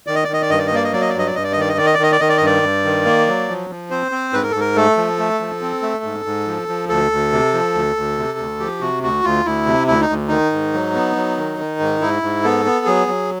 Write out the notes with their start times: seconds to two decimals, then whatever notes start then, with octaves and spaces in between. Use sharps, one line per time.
0.07 D#3 D5
0.15 D#5
0.24 D5
0.28 D#3
0.33 D#5
0.42 D5
0.50 G2 D#5
0.58 D5
0.67 D#5
0.72 A#3 D5
0.84 D#5
0.93 F#3 D5
1.01 D#5
1.09 D5
1.14 G2 D#5
1.26 D5
1.35 G2 D#5
1.44 D5
1.52 D#5
1.57 D#3 D5
1.69 D#5
1.77 D#3 D5
1.86 D#5
1.94 D5
1.99 D#3 D#5
2.12 D5
2.20 D#3 D#5
2.29 D5
2.37 D#5
2.41 G2 D5
2.63 G2
2.85 D#3
3.05 A#3
3.27 F#3
3.48 F3
3.70 F3
3.91 C4 C5
4.12 C4
4.33 G#2 B4
4.43 A#4
4.51 G#2 A4
4.60 A#4
4.76 A3 A4
4.97 F3
5.19 A3
5.40 F3
5.61 C4
5.82 A3
6.04 G#2
6.25 G#2
6.47 F3
6.68 F3
6.89 D2 A4
7.11 D2
7.32 C3
7.54 F3
7.74 D2
7.96 D2
8.18 C3
8.38 D2
8.60 F3 G4
8.81 C3 F#4
9.03 D2 F#4
9.24 D2 F4
9.45 D2 E4
9.66 C3
9.87 D2 E4
10.01 D#4
10.09 D2
10.28 D#3 D#4
10.52 G#2
10.74 F#3
10.94 B3
11.16 F#3
11.37 D#3
11.59 D#3
11.80 G#2
12.01 G#2 E4
12.22 G#2
12.44 B3 A4
12.65 B3
12.86 F#3 G#4
13.07 F#3